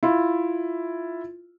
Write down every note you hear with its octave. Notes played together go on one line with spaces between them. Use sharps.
E4 F4